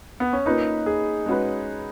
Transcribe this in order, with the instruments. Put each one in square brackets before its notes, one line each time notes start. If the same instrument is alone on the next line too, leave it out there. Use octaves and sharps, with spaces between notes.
[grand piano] B3
C#4
[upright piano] A#3 C#4 F4 B4 [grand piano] D#4
[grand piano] G#4
[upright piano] G#3 C#4 F#4 B4